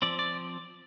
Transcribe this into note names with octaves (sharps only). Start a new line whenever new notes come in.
F3 C4 D5
D5